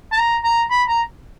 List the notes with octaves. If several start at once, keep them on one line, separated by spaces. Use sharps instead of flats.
A5
A#5
A#5
B5
A#5